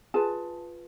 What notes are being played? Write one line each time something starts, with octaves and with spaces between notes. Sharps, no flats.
F4 G#4 B4 A5